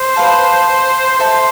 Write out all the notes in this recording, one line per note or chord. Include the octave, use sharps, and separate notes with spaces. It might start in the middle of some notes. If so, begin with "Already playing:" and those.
Already playing: C5
B4 F5 A5
A4 C5 E5 A5